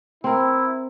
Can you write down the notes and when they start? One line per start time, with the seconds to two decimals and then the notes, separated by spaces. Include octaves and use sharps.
0.24 C4 E4 A#4